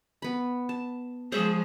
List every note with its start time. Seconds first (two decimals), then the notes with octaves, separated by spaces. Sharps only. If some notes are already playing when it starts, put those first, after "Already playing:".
0.22 B3 B5
0.69 A5
1.32 F3 G#3 G#4 C5 C#5 E5